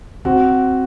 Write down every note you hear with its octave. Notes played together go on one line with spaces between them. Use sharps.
C4 F#4